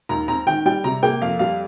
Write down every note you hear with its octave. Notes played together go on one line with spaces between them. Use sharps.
D#2 A#5
C4 A#5
D#3 G5
G3 G5
C3 A#5
A#3 G5
F2 F5
G3 F5